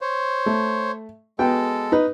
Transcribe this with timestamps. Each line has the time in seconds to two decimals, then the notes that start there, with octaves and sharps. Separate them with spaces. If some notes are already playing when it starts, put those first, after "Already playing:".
0.01 C5 C#5
0.46 A3
1.39 G#3 B3 F#4 A4 G5
1.92 D#4 B4